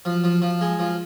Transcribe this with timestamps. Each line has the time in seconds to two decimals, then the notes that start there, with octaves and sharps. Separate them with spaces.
0.05 F3
0.24 F3
0.42 F3
0.61 G#3
0.79 F3